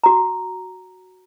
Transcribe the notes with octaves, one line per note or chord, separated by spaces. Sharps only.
F#4 A#5